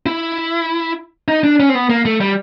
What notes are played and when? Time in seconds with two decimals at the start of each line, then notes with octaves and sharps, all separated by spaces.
0.06 E4
1.28 D#4
1.43 D4
1.60 C#4
1.69 C4
1.75 B3
1.90 A#3
2.05 A3
2.20 G3